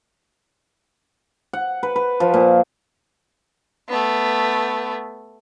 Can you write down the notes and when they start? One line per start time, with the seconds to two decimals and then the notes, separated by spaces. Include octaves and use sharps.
1.53 F#5
1.83 B4
1.96 B4
2.20 F3
2.34 A#2
3.89 A3 B3